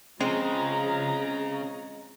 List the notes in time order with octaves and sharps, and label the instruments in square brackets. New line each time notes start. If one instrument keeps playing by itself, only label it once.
[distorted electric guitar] C#3 [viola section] F3 G#4 A#5 [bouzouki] G#3 [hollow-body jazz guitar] C4